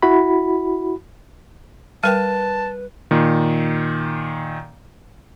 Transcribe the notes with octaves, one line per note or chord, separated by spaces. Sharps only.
E4 F#4 B5
G3 A#4 B4 G5 A5
A#2 D#3